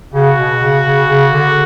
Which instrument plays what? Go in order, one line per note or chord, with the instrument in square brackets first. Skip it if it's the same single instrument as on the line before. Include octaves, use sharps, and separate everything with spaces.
[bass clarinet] C#3 [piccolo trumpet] F#4
[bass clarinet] B2
C#3
C#3
C#3
D3